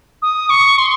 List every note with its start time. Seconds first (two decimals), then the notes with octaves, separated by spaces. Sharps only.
0.22 D#6
0.50 C#6
0.78 C6